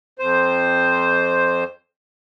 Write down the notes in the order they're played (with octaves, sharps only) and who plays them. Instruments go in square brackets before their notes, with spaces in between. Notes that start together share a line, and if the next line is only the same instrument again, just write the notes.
[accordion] F2 C5